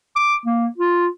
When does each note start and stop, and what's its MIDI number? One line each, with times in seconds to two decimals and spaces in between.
0.16 0.37 86
0.46 0.67 58
0.78 1.07 65